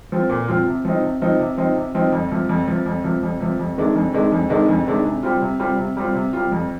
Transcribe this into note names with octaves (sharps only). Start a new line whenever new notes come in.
F3 C4 F4
A#2
F3 C4 F4
C3
F3 C4 D#4
C3
F3 C4 D#4
C3
F3 C4 D#4
C3
F3 C4 D#4
F2
C3 F3
F2
C3 F3
F2
C3 F3
F2
C3 F3
F2
C3 D#3 G#3 D4
F2
C3 D#3 G#3 D4
F2
C3 D#3 G#3 D4
F2
C3 D#3 G#3 D4
C3
G3 C4 F4
C3
G3 C4 F4
C3
G3 C4 F4
C3
G3 C4 F4
F2